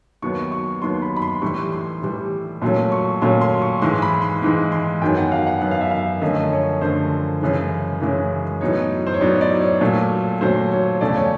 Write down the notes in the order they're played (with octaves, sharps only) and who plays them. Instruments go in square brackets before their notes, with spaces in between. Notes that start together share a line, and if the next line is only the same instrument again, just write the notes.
[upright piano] D#2 D#3 F#3 B3 C#6
C#6
D#2 D#3 F#3 B3 C6
B5
B5
C6
A2 E3 G3 C#6
C6
A2 E3 G3
A#2 F#3 A3 C#4 C6
C#6
A#2 F#3 A3 C#4 C6
C6
C#6
G#2 E3 G#3 C6
B5
C6
G#2 E3 G#3
C6
F#2 D#3 F#3 B3 G5
F#5
F5
F#5
F#2 D#3 F#3 B3 F#5
F5
E5
F5
F#2 D3 F3 A3 C#4 D#5
C#5
F#2 D3 F3 A3 C#4 C5
F#2 C#3 E3 G#3 C#4
F#2 C#3 E3 G#3 C#4
A2 F#3 B3 D#4 C#5
C5
C#5
A2 F#3 B3 D#4 D5
D5
C#5
A#2 F#3 A3
A#2 F#3 A3 C5
C#5
E2 C#3 F3 A3 D5
C#5